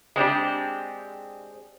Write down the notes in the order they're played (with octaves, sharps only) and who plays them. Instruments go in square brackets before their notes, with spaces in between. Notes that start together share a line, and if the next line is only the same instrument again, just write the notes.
[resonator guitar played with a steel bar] G#3 C4 D4 G4